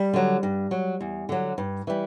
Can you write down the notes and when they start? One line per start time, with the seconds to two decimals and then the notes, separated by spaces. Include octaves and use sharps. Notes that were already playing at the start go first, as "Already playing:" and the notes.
Already playing: G3
0.13 D3 F#3
0.43 G2
0.71 F#3
1.00 E2
1.29 D3 F#3
1.58 G2
1.87 E3 G3